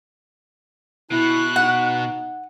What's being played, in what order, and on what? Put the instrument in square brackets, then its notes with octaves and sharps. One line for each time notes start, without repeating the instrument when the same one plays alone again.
[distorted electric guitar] B2 [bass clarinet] E4 [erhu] F#6
[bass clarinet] D#4 [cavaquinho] F#5